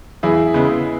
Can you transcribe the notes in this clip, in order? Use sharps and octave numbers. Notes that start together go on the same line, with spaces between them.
E2 E4 G#4
C#3 G#3 B3